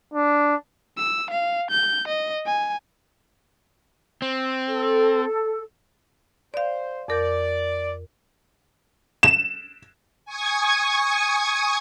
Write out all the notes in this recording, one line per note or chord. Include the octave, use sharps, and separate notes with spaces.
D4
E6
F5
G6
D#5
G#5
C4
A4
C5 D5 F5
F2 A#4 D5 G6
E7
G#5 C#6 D#6 G#6